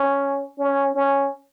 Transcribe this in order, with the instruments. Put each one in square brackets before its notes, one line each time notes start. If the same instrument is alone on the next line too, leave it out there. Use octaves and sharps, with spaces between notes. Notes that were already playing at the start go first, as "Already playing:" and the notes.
Already playing: [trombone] C#4
C#4
C#4